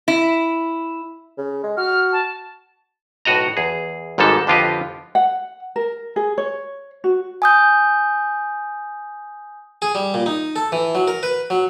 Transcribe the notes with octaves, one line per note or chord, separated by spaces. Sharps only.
E4
C#3
G#3
F#4 F6
A5
B1 A2 F#4 D#5 A#5
E2 G#4
G#1 G#2 G3 G#3 A4 A5
F2 D3 B3 F4 G4 D#5
F#5
A#4
G#4
C#5
F#4
G#5 D#6 G6
G#4
G3
A#2
D#4
A4
E3
F#3
A#4
B4
F#3